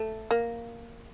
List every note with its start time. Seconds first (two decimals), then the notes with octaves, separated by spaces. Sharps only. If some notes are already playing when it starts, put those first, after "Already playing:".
Already playing: A3
0.31 A#3